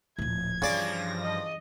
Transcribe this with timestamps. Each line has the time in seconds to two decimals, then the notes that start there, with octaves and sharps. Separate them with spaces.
0.18 D1 A#1 G#6
0.62 G2 C#3 E3 F3 D5 D6 A#6
1.23 D#5